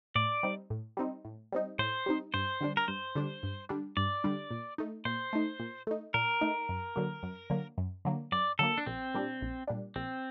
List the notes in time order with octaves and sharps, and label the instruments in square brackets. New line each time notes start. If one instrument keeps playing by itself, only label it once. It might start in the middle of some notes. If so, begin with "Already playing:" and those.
[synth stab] A2 [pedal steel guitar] D5
[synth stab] G3 C4 D#4
A2
G3 C4 D#4
A2
G3 C4 D#4
[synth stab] A2 [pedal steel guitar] C5
[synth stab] G3 C4 D#4
[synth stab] G2 [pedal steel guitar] C5
[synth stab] D3 G3 D4
[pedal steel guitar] A#4
[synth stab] G2 [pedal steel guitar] C5
[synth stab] D3 G3 D4
G2
D3 G3 D4
[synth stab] G2 [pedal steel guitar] D5
[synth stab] D3 G3 D4
A#2
A3 D#4
[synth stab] A#2 [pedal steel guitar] C5
[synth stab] A3 D#4
A#2
A3 D#4
[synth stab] A#2 [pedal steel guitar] A#4
[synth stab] A3 D#4
F#2
D3 F#3 A#3
F#2
D3 F#3 A#3
F#2
D3 F#3 A#3
[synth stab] F#2 [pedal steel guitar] D5
[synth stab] D3 F#3 A#3 [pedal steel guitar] A4
[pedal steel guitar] D4
[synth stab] A#1 [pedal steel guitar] C4
[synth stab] A#2 G3 D4
A#1
A#2 G3 D4
[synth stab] A#1 [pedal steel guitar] C4